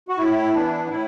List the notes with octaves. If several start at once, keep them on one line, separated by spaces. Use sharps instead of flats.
F#4
A2 E4
E3 B3 D4
A2 E4